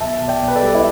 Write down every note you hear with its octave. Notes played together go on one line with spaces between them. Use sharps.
B1 E5 A5
B2
D5 G5
B1
B4
A4 D5
G3
E4